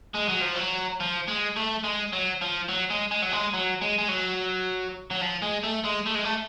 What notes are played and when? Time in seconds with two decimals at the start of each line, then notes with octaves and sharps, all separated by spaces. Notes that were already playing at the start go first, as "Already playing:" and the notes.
0.15 G#3
0.29 F#3
0.42 F3
0.56 F#3
1.00 F3
1.28 G#3
1.56 A3
1.84 G#3
2.13 F#3
2.41 F3
2.68 F#3
2.90 G#3
3.11 G#3
3.22 F#3
3.32 G#3
3.53 F#3
3.81 G#3
3.98 G#3
4.09 F#3
5.11 F#3
5.22 F3
5.43 G#3
5.64 A3
5.85 G#3
6.06 A3
6.15 G#3
6.25 A3